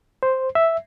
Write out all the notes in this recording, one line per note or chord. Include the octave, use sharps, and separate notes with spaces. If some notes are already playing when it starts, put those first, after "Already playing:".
C5
E5